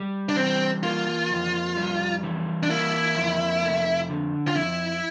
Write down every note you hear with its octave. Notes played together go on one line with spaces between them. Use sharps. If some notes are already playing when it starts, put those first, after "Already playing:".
Already playing: G3
D4
E3 C4
A#3 F4
F2
G3
E3
D4
A#3 E4
F2
A3
D3
F4
F2 E4